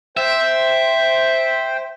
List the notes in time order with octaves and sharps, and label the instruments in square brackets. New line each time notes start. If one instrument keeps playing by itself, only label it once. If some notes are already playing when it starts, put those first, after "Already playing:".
[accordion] C5 G5 [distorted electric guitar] E5